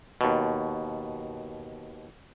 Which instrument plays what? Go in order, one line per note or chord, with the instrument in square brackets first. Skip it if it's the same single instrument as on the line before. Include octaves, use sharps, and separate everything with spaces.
[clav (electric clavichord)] D#2 B2